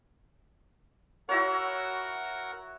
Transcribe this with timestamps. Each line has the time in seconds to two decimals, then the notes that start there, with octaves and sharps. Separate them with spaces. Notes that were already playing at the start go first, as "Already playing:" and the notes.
1.29 E4 F#4 A#4 C#5 F#5